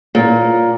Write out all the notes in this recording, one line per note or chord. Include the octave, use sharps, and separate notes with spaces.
A#2